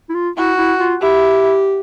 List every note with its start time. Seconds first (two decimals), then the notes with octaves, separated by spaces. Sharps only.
0.09 E4
0.15 F4
0.37 E4 F#4
0.58 E4
0.80 F4
1.01 E4 G4